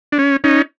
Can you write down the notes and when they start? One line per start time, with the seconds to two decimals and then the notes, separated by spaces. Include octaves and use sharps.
0.12 D4
0.18 C#4
0.44 C#4 D#4